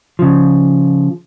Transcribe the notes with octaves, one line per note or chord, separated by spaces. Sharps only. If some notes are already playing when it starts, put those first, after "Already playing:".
C#3 F3